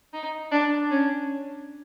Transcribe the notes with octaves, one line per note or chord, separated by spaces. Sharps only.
D#4
D4
C#4